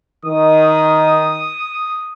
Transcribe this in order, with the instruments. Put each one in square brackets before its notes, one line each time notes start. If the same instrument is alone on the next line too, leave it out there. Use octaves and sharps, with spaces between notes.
[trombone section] D#3 [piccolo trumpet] D#6